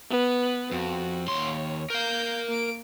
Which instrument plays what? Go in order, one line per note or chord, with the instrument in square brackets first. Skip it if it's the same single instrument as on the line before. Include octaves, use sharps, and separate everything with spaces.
[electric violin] B3 B4
[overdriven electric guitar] F2 [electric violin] F#4
[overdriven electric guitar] D#2 C6 [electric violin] C#5
[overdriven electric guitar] A#4 F5 [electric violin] G6
[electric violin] A#3 D7